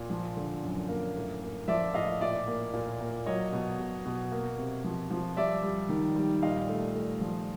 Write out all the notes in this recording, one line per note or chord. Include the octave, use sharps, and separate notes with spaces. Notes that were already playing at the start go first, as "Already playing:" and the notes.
Already playing: A#2
F3
D3
F#2
A#3
A2
A#3
F3 D5 E5
A2 D#5 F5
A#2 D5 E5
A#3
A#2
A#3
F#3 C#5 D#5
B2
B2
B2
A#3
C3
F3
F3
G3 D5 E5
G3
D#3
G3
A#2 D#5 F5
A3
A3
F3